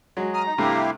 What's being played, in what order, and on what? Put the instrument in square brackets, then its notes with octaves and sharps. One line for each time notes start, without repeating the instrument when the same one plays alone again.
[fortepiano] F#3 G#3
[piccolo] A#5 [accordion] D#6 F6
[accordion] D#4
[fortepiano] G2 C3 A3 [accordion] E4 G4 F5